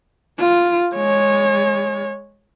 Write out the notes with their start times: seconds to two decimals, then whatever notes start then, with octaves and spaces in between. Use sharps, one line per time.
0.39 F4
0.95 G#3 C#5